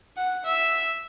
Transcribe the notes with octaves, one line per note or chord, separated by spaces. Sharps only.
F#5
E5